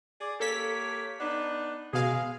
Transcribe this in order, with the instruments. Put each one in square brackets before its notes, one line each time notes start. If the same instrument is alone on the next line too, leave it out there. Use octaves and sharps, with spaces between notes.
[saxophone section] G#4 D5
[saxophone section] A#3 G4 C#5 [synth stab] A4 B6
[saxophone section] B3 D4 D#4
[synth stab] B2 F5 [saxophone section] G#3 G#4